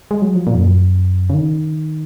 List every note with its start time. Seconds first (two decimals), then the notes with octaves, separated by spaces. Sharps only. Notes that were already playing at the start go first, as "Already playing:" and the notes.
0.11 G#3
0.22 F#3
0.35 F3
0.47 A#2
0.54 F2
0.59 F#2
1.30 C#3
1.34 D#3